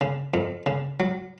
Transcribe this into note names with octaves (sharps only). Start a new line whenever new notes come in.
C#3
F2
C#3
F#3